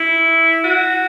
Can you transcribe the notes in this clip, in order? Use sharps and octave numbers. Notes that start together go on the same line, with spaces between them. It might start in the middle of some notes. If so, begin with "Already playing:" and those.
Already playing: E4
F#4